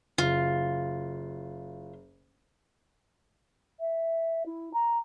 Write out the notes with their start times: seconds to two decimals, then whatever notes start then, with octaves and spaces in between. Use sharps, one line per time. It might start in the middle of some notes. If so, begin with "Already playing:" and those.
0.18 F#1 F4
3.79 E5
4.45 E4
4.73 A#5